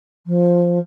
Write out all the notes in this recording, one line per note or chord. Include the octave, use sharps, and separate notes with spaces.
F3